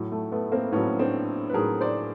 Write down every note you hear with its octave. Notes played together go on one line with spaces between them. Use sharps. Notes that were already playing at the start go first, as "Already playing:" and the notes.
Already playing: A2 F#3
A3
A3 B3
A#3 C4
A2 F#3 B3 C#4
C4 D4
B4
A2 F#3 G#4 A#4
C5 D5